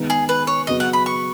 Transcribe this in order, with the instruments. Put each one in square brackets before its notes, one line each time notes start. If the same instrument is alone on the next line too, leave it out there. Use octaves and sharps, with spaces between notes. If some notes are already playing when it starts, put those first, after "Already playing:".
Already playing: [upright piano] D#3 G#3 B3 D#4
[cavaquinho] G#4
B4
C#5
[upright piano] C#3 F#3 B3 [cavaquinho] D#5
[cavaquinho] F#5
B5
C#6